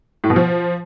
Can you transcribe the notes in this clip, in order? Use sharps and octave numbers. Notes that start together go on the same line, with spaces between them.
A2
B2
F3